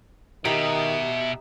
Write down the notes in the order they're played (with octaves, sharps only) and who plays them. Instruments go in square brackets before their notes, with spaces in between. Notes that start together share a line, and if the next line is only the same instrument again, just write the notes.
[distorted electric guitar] B2 [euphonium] D#3 [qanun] D#4 G4 B5 [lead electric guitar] E5 A#5